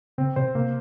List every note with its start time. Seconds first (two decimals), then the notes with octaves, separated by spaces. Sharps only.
0.18 C#3 C4
0.36 C3 C5
0.55 C3 A#3